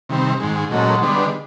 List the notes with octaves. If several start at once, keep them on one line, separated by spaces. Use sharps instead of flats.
C3 D#3 G3 C4
G#2 D#3 G#3
A#2 F#3 G#3 A3 C#4 F#4
D3 G3 B3 D4